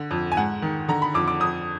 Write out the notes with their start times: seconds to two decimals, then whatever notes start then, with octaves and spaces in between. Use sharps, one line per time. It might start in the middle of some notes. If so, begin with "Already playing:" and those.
Already playing: D3
0.11 F2
0.32 G#5
0.37 G#2 F#5
0.62 D#3
0.89 D3 A#5
1.02 B5
1.14 F2 D6
1.28 D6
1.40 F2 D#6